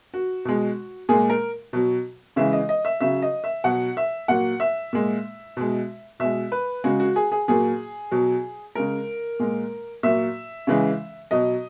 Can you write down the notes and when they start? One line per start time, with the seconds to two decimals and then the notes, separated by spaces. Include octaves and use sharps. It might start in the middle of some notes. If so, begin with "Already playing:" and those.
0.14 F#4
0.45 B2 G#3
1.09 A#2 G#3 G#4
1.30 A#4
1.73 B2 F#3
2.36 C#3 E3 G#3 E5
2.53 D#5
2.69 D#5
2.85 E5
3.01 C#3 F#3 E5
3.22 D#5
3.44 E5
3.64 B2 F#3 F#5
3.97 E5
4.28 A#2 F#3 F#5
4.60 E5
4.93 A#2 G#3
5.57 B2 G#3
6.20 B2 G#3 E5
6.52 B4
6.84 C#3 G#3 F#4
7.00 F#4
7.16 G#4
7.32 G#4
7.48 A#2 F#3 G#4
8.11 B2 F#3
8.75 C#3 G#3 A#4
9.39 A#2 G#3
10.03 A#2 F#3 E5
10.67 C#3 E3 G#3
11.31 B2 F#3 D#5